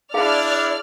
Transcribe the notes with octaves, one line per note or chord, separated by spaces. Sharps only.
D4 E4 G#4 D5 F5 F6